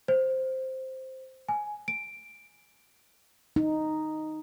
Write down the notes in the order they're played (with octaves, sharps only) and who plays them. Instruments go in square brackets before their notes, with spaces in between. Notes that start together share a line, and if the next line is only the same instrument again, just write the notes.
[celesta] C5
G#5
D7
[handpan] D#4